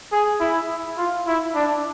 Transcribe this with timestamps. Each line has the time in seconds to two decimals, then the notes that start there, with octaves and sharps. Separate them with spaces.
0.12 G#4
0.40 E4
0.98 F4
1.27 E4
1.55 D4